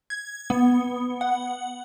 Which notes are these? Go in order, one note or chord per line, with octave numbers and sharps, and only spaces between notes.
G#6
B3
F#5